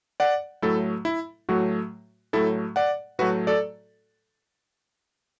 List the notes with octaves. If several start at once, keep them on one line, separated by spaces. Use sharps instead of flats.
D5 F#5
A2 F#3 A3 E4 A4
E4
A2 F#3 A3 F#4
A2 F#3 A3 E4 A4
D5 F#5
A2 F#3 A3 F#4 B4
A4 D5